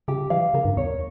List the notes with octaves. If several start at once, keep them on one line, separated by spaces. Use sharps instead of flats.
C#3 G4
E3 F5
C#3 A#4
G2
E2 C#5